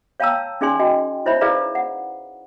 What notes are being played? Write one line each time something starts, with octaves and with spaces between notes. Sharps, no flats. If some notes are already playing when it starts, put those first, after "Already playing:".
C#5 F5 G5 A5 A#5 E6
C#4 D#4 G#4 D5 G#5 C6
F#4 D#5 G5
D#4 E4 C5 C#5 E5 B5
E4 G#4 B4 D5 F5 A#5
F#5